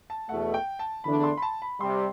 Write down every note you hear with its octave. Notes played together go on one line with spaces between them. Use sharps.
A5
E2 B2 A3 F#5
G5
A5
E2 D3 A3 D4 B5
C6
B5
A5
B5
C3 G3 C6